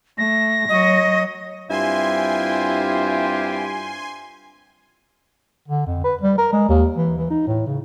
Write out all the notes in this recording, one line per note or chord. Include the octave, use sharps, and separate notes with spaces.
A3 A#6
F#3 C#5 D#5
G2 C4 E4 F4 G4 G#5 C6
D3
F2
B4
G3
A#4
G#3
D#2
E3
E3
D#4
A2
C#3